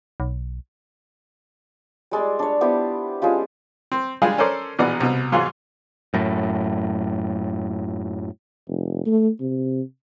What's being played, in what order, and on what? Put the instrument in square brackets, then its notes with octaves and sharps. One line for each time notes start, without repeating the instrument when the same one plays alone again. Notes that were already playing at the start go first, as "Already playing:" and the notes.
[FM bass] B1
[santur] G3 G#3 D5 E6
D4 C#5
B3 E4 G4 C5
G#3 C#4 F4 G4
[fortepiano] C4
G3 G#3 D4 F4 G#4
C#4 A4 A#4 C5 D5
A#1 B2 E3 D5 F#5
C2 B2
E2 G#2 F#3 F4 G#4
[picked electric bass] F#2 A2
[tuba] F1
A3
C3